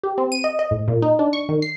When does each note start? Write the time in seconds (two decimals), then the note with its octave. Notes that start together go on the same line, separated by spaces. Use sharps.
0.03 G4
0.18 C4
0.32 D#7
0.44 D#5
0.59 D#5
0.71 A2
0.88 A#2
1.02 D#4
1.19 D4
1.33 C#6
1.49 D#3
1.62 C7